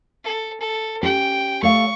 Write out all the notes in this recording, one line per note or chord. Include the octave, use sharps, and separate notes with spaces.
A4
A4
C#4 G4 G5
A3 C#5 F5 C#6